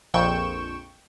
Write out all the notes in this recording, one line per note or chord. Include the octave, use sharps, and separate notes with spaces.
A#1 F2 G5 C#6 E7